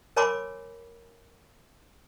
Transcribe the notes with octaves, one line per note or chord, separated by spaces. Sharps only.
A#4 C#5 G#5 B5 C6 D6